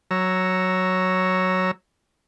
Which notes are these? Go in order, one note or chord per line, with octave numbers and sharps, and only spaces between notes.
F#3 C#5 A#5 E6